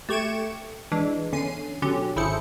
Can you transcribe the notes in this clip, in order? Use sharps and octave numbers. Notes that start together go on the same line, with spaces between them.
A3 G4 C#6 G#6 D7 E7
E3 G#3 D4
E2 D3 C#4 C7 D#7
B2 D3 F#3 C#4 G4
G#1 E4 G#4 A4 C5 C#7